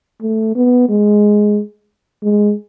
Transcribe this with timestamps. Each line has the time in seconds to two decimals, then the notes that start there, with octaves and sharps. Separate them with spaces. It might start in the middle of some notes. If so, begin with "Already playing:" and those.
0.21 A3
0.55 B3
0.89 G#3
2.23 G#3